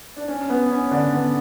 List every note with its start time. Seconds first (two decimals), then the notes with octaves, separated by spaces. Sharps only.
0.17 D4
0.28 C#4
0.50 B3
0.70 C#4
0.91 D3 D4
1.13 B3